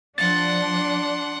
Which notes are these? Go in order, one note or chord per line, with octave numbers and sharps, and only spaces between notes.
F3 D4 F#5 C6 A6